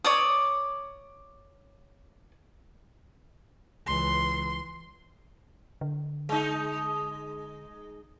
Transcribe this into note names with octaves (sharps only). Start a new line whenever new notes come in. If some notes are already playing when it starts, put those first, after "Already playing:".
C#5 D5 D6 D#6
C#2 E3 C6
D3
G#3 D#4